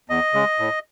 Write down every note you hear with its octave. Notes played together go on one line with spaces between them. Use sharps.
E2 D#5
C#3 G#3
A2